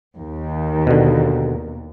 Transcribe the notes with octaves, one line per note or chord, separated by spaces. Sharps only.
D#2
B2 D3